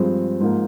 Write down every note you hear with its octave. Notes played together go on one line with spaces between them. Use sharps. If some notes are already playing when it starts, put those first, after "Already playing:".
Already playing: G2 F3 G#3 C4
G#2 F3 A#3